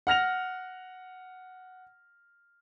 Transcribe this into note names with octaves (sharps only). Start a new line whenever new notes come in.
F#5 F6 A#6 F7